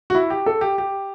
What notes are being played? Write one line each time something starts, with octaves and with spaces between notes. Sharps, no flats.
F#4
E4
G4
A4
G4
G4